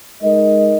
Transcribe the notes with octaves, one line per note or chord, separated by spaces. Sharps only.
G#3 D#4 A#4 D#5